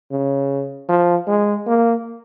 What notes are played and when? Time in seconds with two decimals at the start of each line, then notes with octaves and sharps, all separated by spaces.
0.11 C#3
0.89 F3
1.28 G#3
1.67 A#3